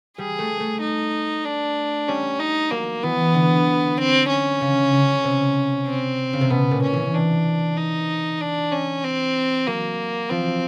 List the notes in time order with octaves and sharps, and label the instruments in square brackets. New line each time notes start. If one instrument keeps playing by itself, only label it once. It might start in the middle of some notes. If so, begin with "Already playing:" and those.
[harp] G3 [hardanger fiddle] G#4
[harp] A3
A3
[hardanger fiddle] D#4
D4
[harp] G3 [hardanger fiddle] C#4
[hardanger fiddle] D#4
[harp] F#3 [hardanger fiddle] A#3
[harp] E3 [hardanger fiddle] B3
[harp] D3
[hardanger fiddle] C4
C#4
[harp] C#3
C#3
C3
[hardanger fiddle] C4
[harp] C#3
C3
[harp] B2 [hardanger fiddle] B3
[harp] A#2
[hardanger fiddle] C#4
[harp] E3
[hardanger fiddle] D4
D#4
D4
C#4
C4
[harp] F#3 [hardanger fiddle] A#3
[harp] F3 [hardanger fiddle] C4